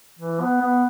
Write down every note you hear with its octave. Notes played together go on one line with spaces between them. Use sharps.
E3
B3
B3